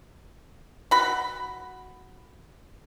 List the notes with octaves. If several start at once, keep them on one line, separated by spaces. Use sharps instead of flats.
F#4 B5